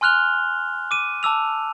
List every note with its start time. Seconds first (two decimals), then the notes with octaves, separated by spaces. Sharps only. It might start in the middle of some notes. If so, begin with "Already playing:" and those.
0.01 G#5 C6 F6 F#6 F7 G7
0.91 D6 D#7
1.23 A5 D6 E6 F7